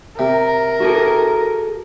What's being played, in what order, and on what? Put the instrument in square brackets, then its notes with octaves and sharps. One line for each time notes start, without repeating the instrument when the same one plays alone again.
[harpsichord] C3 [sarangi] A#4
[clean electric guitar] F#4 G#4 A4